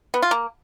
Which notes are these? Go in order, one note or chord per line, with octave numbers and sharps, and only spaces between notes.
B3
F4
A#3